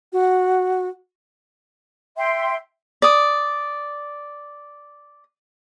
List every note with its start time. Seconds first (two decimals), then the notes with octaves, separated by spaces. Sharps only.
0.13 F#4
2.16 E5 G5 C6
3.02 D5 D#6